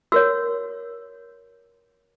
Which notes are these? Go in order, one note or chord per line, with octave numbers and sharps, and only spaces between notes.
F#4 A#4 C#5 E6